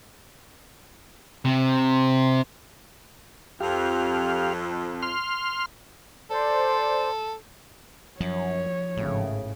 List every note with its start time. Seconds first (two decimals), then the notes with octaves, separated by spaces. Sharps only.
1.45 C3
3.60 F2 G4 F5
5.02 C6 F6
6.30 A4 C5 D5
8.20 F#2 F3 C#5
8.97 G#1 A2 C#3